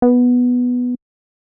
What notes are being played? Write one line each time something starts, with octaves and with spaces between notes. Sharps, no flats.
B3